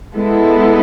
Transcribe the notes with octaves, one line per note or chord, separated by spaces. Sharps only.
G#3 B3 E4 A4